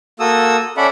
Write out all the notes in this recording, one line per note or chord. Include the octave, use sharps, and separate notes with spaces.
A#3 F#4 A4 D#6 E6
C#4 A4 D5 E5 F#5 B5